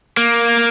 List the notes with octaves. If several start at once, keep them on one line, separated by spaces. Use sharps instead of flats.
A#3